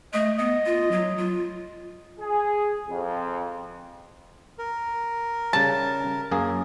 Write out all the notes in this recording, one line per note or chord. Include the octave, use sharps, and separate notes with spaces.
A3 D#5
B3 D#5
F4
F#3
F4
G#4
F2
A#4
C#3 G3 A5
F#2 A#3 G#4